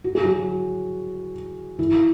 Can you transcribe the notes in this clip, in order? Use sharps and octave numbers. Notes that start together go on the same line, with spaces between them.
F#4
G#4
F#3 F#4
E3 E4